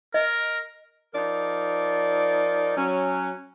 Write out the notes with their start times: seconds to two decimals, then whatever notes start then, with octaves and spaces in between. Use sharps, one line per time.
0.14 A#4 D#5
1.14 F3 D#4 A#4 D5
2.75 F#3 C#4